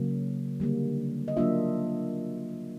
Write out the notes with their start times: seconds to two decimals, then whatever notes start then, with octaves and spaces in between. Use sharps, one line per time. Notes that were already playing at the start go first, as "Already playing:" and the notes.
Already playing: C#3 F#3 A#3
0.60 D3 G3 A#3
1.28 D#5
1.37 F#3 A#3 D4 F4 E5